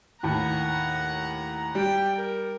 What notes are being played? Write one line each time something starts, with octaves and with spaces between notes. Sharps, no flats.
D#2 A2 F#5 A#5
G3 G5
A#4